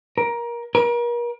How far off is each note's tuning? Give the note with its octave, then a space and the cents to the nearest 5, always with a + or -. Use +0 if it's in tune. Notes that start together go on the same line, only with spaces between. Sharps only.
A#4 +20
A#4 +40